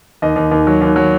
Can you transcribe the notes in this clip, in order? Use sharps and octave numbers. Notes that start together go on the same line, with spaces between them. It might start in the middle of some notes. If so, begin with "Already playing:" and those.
D#2 D#5
D#2
D#2
F#3
D#2
F#3